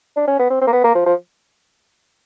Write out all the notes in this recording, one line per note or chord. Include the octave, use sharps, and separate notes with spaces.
D4
C#4
B3
C4
C4
A#3
B3
A#3
F3
F3